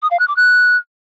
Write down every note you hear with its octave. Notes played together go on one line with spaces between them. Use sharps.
D#6
F5
F#6
D6
F#6